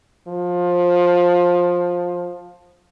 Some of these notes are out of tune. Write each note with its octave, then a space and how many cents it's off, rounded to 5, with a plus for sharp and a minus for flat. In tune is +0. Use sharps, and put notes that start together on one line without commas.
F3 +15